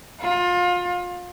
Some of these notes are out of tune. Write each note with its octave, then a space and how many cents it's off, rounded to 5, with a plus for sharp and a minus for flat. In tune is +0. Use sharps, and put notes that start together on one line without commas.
F4 +25